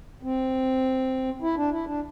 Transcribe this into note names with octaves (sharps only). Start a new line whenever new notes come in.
C4
E4
D4
E4
D4